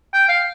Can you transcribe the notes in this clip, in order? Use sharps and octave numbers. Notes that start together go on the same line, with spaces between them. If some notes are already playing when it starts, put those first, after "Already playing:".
G5
F5